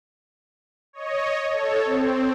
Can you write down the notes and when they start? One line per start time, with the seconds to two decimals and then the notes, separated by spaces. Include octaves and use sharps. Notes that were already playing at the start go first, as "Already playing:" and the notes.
0.93 C#5 D#5
1.52 A4 C#5
1.85 C4